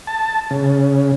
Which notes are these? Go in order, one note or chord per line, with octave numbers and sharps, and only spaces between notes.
A5
C#3